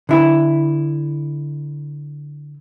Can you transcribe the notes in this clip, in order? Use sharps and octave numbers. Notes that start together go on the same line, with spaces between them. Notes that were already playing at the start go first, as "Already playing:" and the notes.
D3 E4